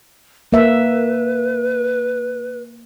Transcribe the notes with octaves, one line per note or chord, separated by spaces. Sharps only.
A#3 B4 E5